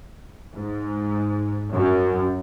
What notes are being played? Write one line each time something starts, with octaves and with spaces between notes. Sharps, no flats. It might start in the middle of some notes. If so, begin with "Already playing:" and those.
G#2
F#2